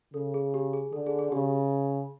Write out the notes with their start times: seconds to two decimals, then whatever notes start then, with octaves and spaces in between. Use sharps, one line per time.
0.14 C#3 A4
0.34 G#4
0.54 G4
0.73 G#4
0.92 D3 A4
1.07 G#4
1.19 G#4
1.32 C#3 G4